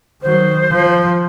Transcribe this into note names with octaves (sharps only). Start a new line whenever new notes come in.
D#3 F#3 C5
F3